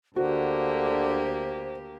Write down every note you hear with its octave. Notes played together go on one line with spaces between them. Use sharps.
D2 D3 A#3 F#4 G4 C5